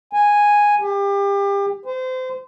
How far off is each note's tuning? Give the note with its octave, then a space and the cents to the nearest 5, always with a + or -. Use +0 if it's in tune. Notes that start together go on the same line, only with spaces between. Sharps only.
G#5 -5
G4 +30
C5 -30